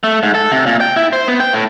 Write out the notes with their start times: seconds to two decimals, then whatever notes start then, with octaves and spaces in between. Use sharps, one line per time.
0.04 A3
0.23 G#2
0.35 A4
0.51 C3
0.66 A#2
0.81 G5
0.96 E4
1.13 C5
1.28 B3
1.40 G5
1.53 A2